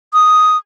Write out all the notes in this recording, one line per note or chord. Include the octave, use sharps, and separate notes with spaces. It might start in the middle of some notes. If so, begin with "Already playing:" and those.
D#6